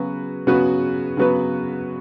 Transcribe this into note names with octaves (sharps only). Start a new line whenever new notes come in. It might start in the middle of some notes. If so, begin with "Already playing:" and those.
Already playing: C#3 F#3 B3 F#4 B4
C#3 F#3 B3 F#4 B4
C#3 F#3 B3 F#4 B4